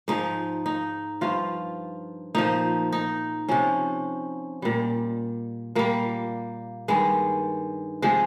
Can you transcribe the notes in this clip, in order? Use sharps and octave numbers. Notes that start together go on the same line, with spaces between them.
G#2 F3 D#4
D#4
G2 F3 F4
A#2 F3 D#4
D#4
C3 F3 C#4
A#2 G3
A#2 G3 A#3
G2 D#3 G3 G#3
C3 F3 G#3